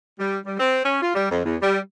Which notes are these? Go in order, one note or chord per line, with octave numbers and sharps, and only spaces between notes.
G3
G3
C4
C#4
F4
G3
F2
E2
G3